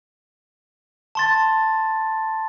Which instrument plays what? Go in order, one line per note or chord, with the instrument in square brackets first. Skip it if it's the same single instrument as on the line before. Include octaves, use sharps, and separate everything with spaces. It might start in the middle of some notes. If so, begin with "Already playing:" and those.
[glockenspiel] A5 C6 A6